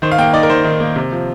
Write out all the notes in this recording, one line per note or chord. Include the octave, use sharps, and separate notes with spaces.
D#3 C5
F5
A#3 G5
D#4 D5
A#4
D#3 C5
D#3
A#3
C3
F3